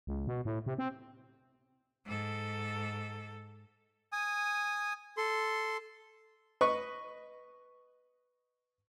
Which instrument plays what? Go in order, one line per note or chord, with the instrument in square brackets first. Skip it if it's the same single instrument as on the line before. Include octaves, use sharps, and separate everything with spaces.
[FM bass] C#2
B2
A2
C3
C4
[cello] G#2 A4
[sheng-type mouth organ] G#5 D#6
A4 C6
[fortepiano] B4 D#5 C#6